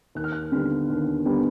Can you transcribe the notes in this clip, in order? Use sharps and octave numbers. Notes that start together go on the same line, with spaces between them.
D#2 F#6
F6
F#6
D3 G3 B3
D#2
D3 G3 B3